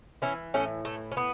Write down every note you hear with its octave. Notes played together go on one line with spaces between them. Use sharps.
E3 C#4 E4
A2 A3 C#4
E3 A3
C#4
A2 B3